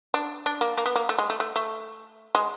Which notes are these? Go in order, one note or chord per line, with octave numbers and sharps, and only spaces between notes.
D4
D4
A#3
A#3
B3
A#3
A3
G#3
A3
A3
A3
G#3